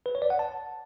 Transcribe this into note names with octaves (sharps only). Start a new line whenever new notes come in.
B4
C#5
D5
F#5
A5